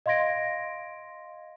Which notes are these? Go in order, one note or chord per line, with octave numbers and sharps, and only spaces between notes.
D#5 F5 C6 G#6 A#6 D7